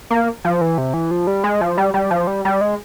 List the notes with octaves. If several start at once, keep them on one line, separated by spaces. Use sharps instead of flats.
A#3
F3
E3
C3
E3
F3
G3
G#3
F3
G3
G3
F3
G3
G3
G#3